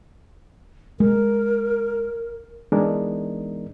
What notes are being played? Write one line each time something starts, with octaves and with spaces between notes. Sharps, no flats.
G#3 A#4
E3 G#3 B3 D4 D#4 A#4